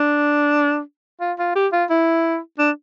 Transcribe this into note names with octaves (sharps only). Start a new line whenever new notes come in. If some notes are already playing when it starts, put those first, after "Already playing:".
Already playing: D4
F4
F4
G4
F4
E4
D4